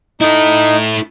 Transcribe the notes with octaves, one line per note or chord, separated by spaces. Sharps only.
D#4 E4 A4